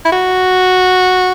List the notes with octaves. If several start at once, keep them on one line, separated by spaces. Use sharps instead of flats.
E4
F#4